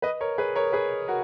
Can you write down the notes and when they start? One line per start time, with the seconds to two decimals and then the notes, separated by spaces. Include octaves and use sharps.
0.02 B4 D#5
0.21 A#4 C#5
0.38 G#4 B4
0.56 A#4 C#5
0.73 G#4 B4
1.08 F#4 A#4